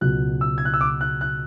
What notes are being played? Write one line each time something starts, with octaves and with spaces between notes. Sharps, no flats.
C#2 B2 F#3 F#6
E6
G#6
F#6
E6
D6
F#6
F#6